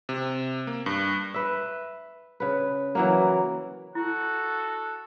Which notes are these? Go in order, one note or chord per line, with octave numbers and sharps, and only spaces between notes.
C3
A#3
G2
B4 E5
C#3 B4
E3 F#3 A#3
E4 F#4 A4